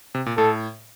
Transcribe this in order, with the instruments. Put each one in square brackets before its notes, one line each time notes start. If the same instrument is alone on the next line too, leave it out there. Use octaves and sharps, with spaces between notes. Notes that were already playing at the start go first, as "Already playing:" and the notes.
[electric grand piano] C3
A#2
[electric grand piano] A2 [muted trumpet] A4